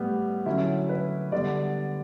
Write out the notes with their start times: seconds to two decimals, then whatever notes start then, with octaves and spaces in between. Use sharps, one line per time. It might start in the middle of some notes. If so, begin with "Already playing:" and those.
Already playing: A2 G3 B3
0.46 D3 F#3 C#4 E4
0.89 B4
1.32 D3 G3 B3 D5